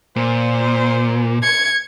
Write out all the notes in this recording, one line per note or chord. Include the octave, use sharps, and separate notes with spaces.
A#2 C5
G#6 C#7